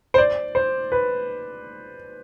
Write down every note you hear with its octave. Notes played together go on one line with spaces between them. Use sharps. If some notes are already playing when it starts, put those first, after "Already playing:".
C5
D5
C5
B4